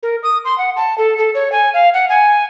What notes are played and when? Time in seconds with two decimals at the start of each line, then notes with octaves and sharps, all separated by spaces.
0.03 A#4
0.23 D#6
0.45 C6
0.58 F#5
0.77 A5
0.98 A4
1.18 A4
1.35 C#5
1.52 G#5
1.74 F5
1.94 F#5
2.09 G#5